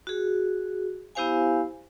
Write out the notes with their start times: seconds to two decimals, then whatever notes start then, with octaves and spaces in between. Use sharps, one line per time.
0.07 F#4 G#4
1.15 B3 E4 G4 C5 F5 G#5